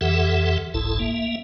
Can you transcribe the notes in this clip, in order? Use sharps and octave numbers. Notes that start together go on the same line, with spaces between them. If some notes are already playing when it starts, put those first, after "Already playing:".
F2 E3 G4 A4 E5 F#5
F#1 C2 G#2 E4 A4 A5
A#3 E5